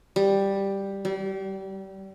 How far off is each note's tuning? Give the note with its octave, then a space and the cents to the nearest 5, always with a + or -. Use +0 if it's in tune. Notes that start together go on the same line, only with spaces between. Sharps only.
G3 +5
G3 -30